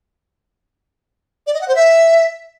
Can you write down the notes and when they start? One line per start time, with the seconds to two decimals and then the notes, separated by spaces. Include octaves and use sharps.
1.47 D5
1.54 D#5
1.61 F#5
1.68 C5
1.75 E5